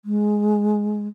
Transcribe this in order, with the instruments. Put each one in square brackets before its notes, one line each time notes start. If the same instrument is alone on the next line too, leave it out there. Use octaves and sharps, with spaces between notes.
[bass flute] G#3